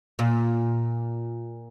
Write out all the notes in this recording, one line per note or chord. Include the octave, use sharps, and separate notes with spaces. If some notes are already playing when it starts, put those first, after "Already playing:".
A#2